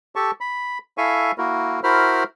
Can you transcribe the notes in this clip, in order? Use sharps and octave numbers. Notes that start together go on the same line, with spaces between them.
G4 A4 A5 C#6
B5
E4 A4 E5 F5 G#5 C#6
A#3 E4 F#4 A#4
E4 F#4 A#4 C5 B5 F6